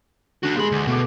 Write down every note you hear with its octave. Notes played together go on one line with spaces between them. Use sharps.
D3 D4 F#4
A#2 G#3 G#4 B5 C6
D2
B2 A3 D6